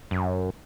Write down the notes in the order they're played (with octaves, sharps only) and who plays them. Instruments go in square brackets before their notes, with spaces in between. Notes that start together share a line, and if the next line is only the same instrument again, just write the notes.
[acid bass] F#2